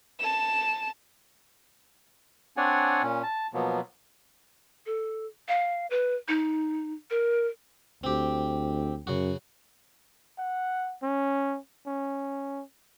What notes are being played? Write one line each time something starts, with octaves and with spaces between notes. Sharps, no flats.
A5 E7
C4 D4 C#5 D5 F#5 G#5
A#2 C#4
A5
B2 F3 F#3 A#3 B3
A4
F5
B4
D#4
A#4
D2 C4 G4
F#2 C#3 F#4
F#5
C#4
C#4